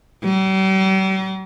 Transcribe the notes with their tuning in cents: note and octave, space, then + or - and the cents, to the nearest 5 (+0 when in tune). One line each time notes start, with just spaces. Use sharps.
G3 -45